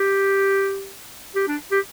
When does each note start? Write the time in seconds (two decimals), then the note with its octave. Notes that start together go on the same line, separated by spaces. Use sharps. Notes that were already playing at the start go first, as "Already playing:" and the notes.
Already playing: G4
1.35 G4
1.48 D4
1.71 G4